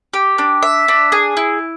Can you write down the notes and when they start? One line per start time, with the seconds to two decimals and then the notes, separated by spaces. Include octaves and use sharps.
0.14 G4
0.38 D4
0.63 E5
0.88 D4
1.12 G#4
1.37 E4